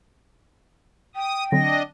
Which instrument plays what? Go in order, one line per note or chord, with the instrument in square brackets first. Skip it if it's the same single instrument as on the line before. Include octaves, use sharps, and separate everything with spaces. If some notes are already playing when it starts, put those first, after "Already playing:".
[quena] G5 [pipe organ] D#6
[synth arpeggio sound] D3 F#3 C4 [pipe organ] D4 D#5 [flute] A#6